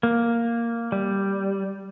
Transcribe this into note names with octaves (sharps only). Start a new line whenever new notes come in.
A#3
G3